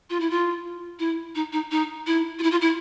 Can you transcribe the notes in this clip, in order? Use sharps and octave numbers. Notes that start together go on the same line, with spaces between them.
F4
E4
F4
E4
D#4
D#4
D#4
E4
F4
E4
F4
E4